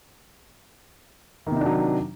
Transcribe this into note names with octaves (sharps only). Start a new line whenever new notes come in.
C3 D#3 F#3 D4 D#4